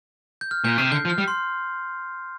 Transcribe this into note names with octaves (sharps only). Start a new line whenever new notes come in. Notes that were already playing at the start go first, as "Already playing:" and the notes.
G6
F6
A#2 G6
C3 C7
D3 G6
F3
F6
G3
C6